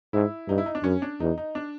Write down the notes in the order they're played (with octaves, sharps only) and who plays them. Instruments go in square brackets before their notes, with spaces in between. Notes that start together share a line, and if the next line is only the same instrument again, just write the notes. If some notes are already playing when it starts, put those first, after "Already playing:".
[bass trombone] G#2 [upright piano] E4
[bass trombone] G2 [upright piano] D#4
[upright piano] E4
D#4
D4
[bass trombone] F#2 [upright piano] C#4
[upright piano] D4
[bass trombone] E2 [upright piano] D#4
[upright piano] D#4
D4